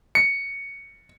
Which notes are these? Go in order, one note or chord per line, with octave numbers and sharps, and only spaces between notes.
C#7